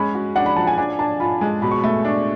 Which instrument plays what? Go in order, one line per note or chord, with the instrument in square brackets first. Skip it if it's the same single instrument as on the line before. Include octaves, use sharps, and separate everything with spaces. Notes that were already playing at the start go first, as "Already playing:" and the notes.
Already playing: [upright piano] G#3 C#4 [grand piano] B5
[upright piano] F#4
[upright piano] D4 [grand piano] F#5
[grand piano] B5
[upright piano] F3 [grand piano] A5
[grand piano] G#5
[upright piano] D4 [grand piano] G#5
[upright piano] D4 [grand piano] A5
[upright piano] F4 [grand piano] B5
[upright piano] G#3
[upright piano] B2 [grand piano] B5
[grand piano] C#6
[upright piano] A3 [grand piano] B5
[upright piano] D4